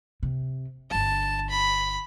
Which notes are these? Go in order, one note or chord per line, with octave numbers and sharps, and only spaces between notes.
C3
G1 D4 A5
B5